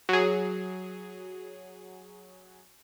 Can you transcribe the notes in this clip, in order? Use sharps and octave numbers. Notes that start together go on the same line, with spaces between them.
F#3 G#4